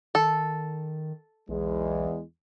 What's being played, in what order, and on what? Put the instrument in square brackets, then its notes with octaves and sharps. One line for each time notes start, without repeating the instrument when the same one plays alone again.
[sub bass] D#3 [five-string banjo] A4
[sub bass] B1 [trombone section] E2 G#3